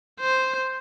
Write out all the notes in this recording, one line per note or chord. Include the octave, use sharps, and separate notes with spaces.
C5